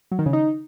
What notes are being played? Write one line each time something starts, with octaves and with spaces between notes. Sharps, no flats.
F#3
D#3
C#3
D#4